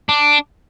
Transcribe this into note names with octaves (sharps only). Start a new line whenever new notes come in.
D4